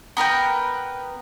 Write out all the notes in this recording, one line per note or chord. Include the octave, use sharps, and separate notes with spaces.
B3 A#4 B4 G5